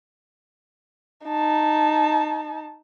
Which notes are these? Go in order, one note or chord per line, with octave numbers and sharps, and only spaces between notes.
D#4 A5